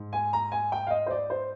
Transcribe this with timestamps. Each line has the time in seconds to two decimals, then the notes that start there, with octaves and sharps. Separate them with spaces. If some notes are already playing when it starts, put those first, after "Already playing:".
Already playing: G#2
0.13 G#5
0.33 A#5
0.52 G#5
0.72 G5
0.87 F5
0.90 D#5
1.06 C5
1.11 D5
1.30 C5